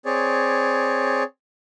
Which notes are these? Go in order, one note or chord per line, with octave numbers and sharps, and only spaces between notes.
C4 G#4 C#5 D5